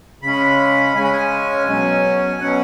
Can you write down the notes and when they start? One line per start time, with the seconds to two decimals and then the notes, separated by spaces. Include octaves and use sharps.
0.22 C#3 G#3 C#4 B5
0.95 C#3 G#3 C#4 G#5
1.04 B5
1.13 G#5
1.67 B2 F#3 C#4
2.40 B2 F#3 C#4 F#5